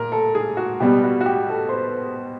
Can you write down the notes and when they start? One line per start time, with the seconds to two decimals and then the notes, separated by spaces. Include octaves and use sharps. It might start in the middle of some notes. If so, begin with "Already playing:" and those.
Already playing: A#2 A#4
0.12 A4
0.35 G#4
0.57 F#4
0.80 B2 G3 B3 G4
1.04 F#4
1.21 F#4
1.26 G4
1.49 A4
1.69 C5
1.72 B4